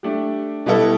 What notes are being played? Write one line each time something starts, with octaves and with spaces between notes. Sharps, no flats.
A3 D4 G4
B2 G3 B3 E4 A4